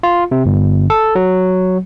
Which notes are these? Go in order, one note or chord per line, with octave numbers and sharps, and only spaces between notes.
F4
C3
G1
A4
F#3